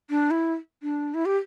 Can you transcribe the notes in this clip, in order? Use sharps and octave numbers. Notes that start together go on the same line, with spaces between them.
D4
E4
D4
E4
G4